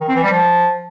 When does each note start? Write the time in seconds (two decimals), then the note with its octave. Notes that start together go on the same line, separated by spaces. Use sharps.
0.01 D#3
0.08 C4
0.16 E3
0.23 G3
0.31 F3